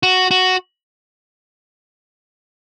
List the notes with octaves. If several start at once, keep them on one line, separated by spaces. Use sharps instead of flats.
F#4
F#4